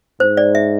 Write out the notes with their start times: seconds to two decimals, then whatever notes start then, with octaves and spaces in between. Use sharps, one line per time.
0.20 G#2 C5
0.37 D5
0.55 E5